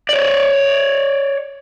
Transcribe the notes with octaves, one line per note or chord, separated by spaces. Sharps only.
C#5 D5